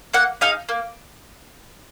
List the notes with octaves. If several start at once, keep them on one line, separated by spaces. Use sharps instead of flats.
A#3 F#5
D#4 G#4 F5
A#3